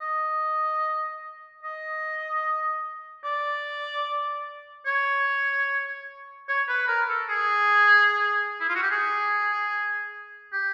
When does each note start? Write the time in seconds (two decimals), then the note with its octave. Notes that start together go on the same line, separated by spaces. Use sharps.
0.01 D#5
1.63 D#5
3.24 D5
4.86 C#5
6.48 C#5
6.69 B4
6.88 A#4
7.09 A4
7.29 G#4
8.60 E4
8.68 F4
8.75 F#4
8.82 G4
8.90 G#4
10.52 G4